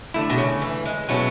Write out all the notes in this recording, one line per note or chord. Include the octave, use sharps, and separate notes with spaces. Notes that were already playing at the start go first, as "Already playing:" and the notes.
D3 A3 E4
B2
C#3
E3
G#3
B2 F#3 G#3 A3 C#4 E4